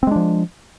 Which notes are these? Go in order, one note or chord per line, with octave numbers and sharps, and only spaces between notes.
F3 G#3 C4 D4